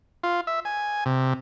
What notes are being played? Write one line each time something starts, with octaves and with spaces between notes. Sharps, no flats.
F4
E5
G#5
C3